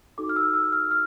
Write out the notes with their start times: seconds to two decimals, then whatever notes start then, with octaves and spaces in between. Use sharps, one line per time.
0.18 D#4 F#4 A4 D6
0.29 F6
0.36 E6
0.54 E6
0.72 F6
0.91 F6